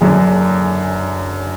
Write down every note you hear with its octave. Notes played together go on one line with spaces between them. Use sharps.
F#1 F#2 D3 G#4